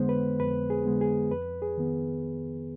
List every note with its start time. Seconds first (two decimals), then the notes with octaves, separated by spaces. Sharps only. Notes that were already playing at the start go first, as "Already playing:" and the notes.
Already playing: F2 D3 G#3 B3 C5
0.09 B4
0.40 F2 B4
0.70 G#4
0.85 D3 G#3 B3
1.01 G#4
1.31 F2 B4
1.62 G#4
1.77 D#3 B3